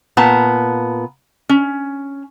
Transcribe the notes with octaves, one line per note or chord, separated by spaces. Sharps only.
A#2 B3 A5 A#5
C#4